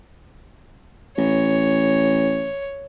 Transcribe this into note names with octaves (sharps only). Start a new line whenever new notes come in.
A1 C#5